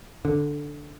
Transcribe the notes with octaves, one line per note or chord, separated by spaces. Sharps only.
D3